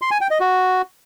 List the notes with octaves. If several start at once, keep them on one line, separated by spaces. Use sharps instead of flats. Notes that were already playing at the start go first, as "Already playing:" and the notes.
C6
G#5
G5
D#5
F#4